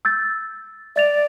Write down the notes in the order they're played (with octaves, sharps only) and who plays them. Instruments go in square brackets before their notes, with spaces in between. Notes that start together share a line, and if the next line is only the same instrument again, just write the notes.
[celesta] E6 G6 A6
[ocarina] D5 [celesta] E5 A6 F7